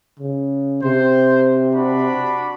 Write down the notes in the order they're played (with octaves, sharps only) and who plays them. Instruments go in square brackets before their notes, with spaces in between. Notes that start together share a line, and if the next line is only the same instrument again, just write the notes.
[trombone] C#3
[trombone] C3 [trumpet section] C5
[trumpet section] D4 F#4 B5